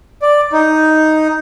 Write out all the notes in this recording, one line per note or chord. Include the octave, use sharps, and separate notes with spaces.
D5
D#4